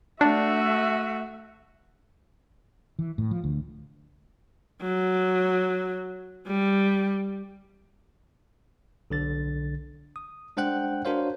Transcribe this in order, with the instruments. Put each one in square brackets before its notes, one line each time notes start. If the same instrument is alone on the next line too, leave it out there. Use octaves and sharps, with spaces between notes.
[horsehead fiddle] A3 E5 [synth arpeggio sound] D4 [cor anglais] F#4
[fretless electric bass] E3
A2
F3
D2
[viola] F#3
G3
[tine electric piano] B1 D3 A6
D#6
G#3 D4 C5 F#5 G5 F#6
D4 F#4 A#4 C5 C#5 F5